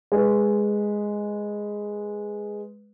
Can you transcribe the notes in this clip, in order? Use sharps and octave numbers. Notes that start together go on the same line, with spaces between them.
G#3 B4